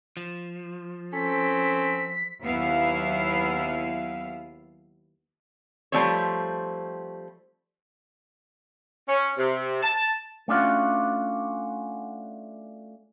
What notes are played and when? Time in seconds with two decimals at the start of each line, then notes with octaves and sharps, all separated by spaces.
0.17 F3
1.12 C4 C#4 A4 B6
2.44 D#2 F#3 B3 E4 E5 F5
5.92 F3 G3 A3 C4 C#5
9.09 C#4
9.39 C3
9.83 A5
10.48 A3 C#4 D4 F4 F#4